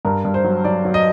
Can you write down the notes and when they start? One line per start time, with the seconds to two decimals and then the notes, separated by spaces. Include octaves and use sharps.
0.05 G2 A#4
0.25 G2
0.34 C5
0.44 F#3
0.64 F#3 D5
0.85 F#3
0.94 D#5